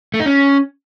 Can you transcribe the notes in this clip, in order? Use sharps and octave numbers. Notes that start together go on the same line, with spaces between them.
A3
D#4
C#4